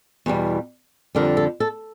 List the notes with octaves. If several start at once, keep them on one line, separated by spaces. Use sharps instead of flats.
E2 B2 G3
F2 D3 G3 A#4
A4
A4